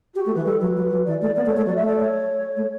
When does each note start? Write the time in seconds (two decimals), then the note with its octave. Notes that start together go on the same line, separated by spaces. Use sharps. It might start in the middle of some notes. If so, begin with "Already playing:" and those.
0.15 F#4 G4
0.26 A3
0.35 E3 B4
0.45 G3 A4
0.60 F#3 B4
0.76 F#3
0.91 F#3
1.06 E3 D5
1.21 A3 D5
1.36 B3 D5
1.46 A3
1.51 C#5
1.57 A3
1.66 F#3 D5
1.76 E5
1.81 A3
1.86 D5
1.96 C#5
2.56 A3